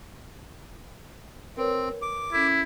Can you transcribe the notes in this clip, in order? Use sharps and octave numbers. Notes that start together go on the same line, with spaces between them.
C4 A#4 B4 C#5
D6
C#4 E4 A4